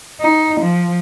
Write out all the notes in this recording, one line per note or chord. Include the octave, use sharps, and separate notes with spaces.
D#4
F3